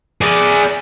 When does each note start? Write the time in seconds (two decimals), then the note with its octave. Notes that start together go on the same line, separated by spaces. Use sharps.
0.21 G#4 D5